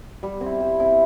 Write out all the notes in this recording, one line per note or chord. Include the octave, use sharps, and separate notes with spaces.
G3
C4
E4
G3
C4 E4